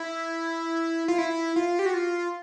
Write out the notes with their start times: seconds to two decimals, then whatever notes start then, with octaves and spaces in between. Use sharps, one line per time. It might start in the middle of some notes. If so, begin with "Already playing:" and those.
Already playing: E4
1.08 F4
1.18 E4
1.56 F4
1.79 G4
1.86 F#4
1.94 F4